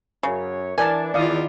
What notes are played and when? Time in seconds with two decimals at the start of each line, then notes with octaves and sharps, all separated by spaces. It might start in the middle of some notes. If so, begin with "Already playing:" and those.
0.23 F#2 C#3 C#5
0.78 E3 D4 A#4 D5 G#5 A5
1.14 E2 D#3 E4 F4 D5 F5 D#6